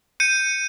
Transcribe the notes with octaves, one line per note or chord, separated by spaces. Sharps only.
G6 C#7 D#7